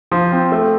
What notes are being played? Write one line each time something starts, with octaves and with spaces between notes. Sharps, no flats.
F3
C4
A3